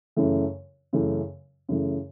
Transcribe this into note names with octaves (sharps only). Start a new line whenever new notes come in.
F#2 C#3 E3 A3
F#2 C#3 E3 A3
F#2 C#3 E3 A3